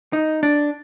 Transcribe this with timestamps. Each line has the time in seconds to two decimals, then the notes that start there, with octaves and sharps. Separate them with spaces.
0.13 D#4
0.43 D4